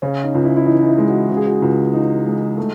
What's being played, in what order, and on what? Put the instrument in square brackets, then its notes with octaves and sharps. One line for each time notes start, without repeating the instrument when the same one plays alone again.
[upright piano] C#3 [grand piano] C#4
[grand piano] D#4
[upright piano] C#2
[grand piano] E4
E4
[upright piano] E3 [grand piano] D#4
[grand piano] D#4
E4
[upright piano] G#3
[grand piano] F#4
[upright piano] C#3 [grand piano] F#4
[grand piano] G#4
F#4
[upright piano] C#2
[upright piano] E3 [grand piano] D#4
[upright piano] G#3
A3